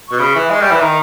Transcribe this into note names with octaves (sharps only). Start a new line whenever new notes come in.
B2 C#6
C#3 B5
E3
G#3 C#6
G3 B5
E3
D#3 A#5